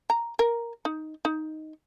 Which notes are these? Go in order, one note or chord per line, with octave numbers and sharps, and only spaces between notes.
A#5
A#4
D#4
D#4